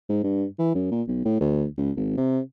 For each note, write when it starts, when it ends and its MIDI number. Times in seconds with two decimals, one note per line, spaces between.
0.09 0.19 44
0.23 0.45 43
0.59 0.73 52
0.74 0.87 42
0.91 1.02 46
1.08 1.20 35
1.25 1.36 45
1.40 1.66 38
1.77 1.91 37
1.96 2.15 32
2.17 2.39 48